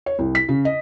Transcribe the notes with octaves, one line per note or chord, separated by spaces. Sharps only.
C#5
C2
B6
C#3
D#5